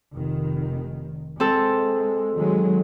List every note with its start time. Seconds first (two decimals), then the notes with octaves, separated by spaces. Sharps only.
0.14 F1 D#3
1.40 G#3 C4 A4
2.37 D#3 F#3 G#3